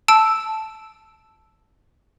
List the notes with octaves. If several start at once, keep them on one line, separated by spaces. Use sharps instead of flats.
A5 E6 D7